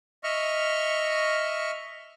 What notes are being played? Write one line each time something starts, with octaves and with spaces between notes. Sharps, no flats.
D#5 E5 C#6 F6